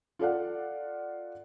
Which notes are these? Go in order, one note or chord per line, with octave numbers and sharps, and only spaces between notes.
F4 A4 D5 F5 F#5